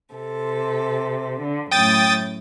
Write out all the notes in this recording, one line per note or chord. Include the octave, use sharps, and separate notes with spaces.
C3 A4
D3
F#2 A2 G5 D#6 A6